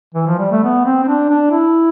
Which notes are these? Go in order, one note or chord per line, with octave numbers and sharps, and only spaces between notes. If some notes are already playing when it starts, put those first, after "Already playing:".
E3
F3
G3
A3
B3
C4
C4
D4
D4
E4